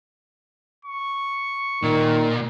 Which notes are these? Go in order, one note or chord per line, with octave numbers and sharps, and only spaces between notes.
C#6
A#2 D#3